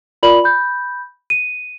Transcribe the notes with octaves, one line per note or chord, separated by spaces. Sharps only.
F4 A#4 D5 B5 F#7
B5 G6
D#7